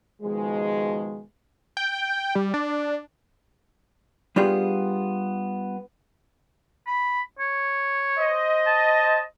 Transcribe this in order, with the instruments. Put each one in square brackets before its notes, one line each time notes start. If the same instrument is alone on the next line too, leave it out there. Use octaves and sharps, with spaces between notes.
[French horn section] B2 D#3 F3 G#3
[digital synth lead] G5
G3
D4
[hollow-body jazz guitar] G3 B3 D4 F4 G4 G#4
[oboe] B5
C#5
[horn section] C5 D#5
[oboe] A5